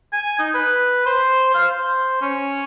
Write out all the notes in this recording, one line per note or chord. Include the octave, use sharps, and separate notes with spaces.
G#5
D#4
B4
C5
F5
C5
C#4